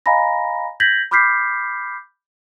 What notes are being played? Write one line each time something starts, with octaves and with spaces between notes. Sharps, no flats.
D#5 F5 G#5 A#5 B5 A#6
G6 G#6 A#6 B6 F#7
B5 D6 F6 G6 B6 C7